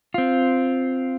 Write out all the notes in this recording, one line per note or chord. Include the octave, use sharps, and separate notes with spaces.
C4 F4